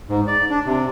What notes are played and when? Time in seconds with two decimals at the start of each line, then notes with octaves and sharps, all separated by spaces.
0.09 G#2
0.27 D5
0.50 D4
0.66 C3